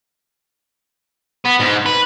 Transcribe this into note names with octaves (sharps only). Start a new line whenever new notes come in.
B3
G#2
B4